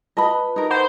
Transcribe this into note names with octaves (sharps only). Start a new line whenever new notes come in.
F4 B4 D#5 A5 B5 D#6
D#4 G4 A#4
C5 F#5 B5